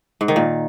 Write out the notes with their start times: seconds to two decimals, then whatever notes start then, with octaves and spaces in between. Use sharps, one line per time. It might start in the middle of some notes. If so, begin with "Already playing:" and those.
0.21 G#2
0.28 D#3
0.36 A#2